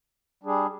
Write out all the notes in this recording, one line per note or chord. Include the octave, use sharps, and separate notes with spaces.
G3 D4 G#4